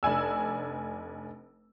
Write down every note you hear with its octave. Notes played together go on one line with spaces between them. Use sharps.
F1 D4 G#5 E6